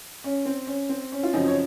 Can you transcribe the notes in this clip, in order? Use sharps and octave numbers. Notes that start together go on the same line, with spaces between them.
C#4
C4
C#4
C4
C#4
F4
F#2 C#3 F3 C4 D#4
C#5